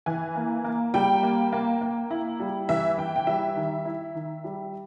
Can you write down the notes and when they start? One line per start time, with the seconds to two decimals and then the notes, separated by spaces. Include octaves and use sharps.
0.06 E3 G#5
0.36 A#3
0.64 A#3
0.94 G3 G5
1.23 A#3
1.52 A#3
1.81 A#3
2.11 E4
2.40 G3
2.69 E3 E5
2.98 E3 G5
3.16 G5
3.27 G3 E5
3.56 D#3
3.85 E4
4.15 D#3
4.44 G3